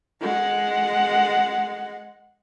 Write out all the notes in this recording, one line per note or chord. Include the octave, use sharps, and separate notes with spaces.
G#3 F#5